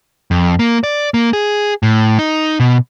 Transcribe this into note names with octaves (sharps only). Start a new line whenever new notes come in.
F2
A#3
D5
A#3
G#4
A2
D#4
B2